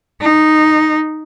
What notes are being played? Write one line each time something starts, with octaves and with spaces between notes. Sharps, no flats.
D#4